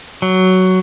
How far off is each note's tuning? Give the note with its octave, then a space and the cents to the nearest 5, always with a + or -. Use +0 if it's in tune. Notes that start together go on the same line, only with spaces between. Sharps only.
F#3 +10